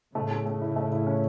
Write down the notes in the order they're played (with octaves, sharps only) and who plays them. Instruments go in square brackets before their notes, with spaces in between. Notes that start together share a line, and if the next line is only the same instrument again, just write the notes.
[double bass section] A2 C#3 [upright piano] A3
[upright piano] A3
A3
E4
A3
E4
C#4